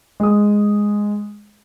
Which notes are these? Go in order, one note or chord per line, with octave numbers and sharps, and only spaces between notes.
G#3 D#6